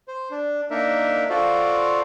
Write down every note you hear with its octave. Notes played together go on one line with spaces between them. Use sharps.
C5
D4
A#3 D4 D#4 A#4 E5
F4 F#4 A4 C5 D5 F5